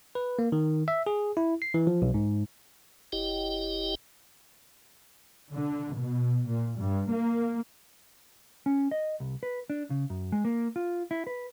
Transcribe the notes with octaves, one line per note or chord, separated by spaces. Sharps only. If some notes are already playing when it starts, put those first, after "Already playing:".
B4
A#3
D#3
E5
G#4
E4
C7
E3
F3
B1
G#2
F#1 E4 G4 D#5 G5
D3
B2
A#2
G2
A#3
C#4
D#5
C2
B4
D4
C#3
F#2
G#3
A#3
F4
E4
B4